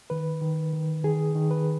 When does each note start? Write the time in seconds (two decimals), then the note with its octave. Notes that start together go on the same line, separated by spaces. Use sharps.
0.10 D#3 B4
0.42 D#3
0.73 D#3
1.04 D#3 G#4
1.35 D#3
1.51 B4